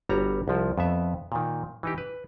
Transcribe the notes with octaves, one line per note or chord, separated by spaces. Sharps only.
G1 G3 F#4 C#5 A#5
C2 F3
F2 B3 E5
A#2 D#3
E3 D#4 G4
B4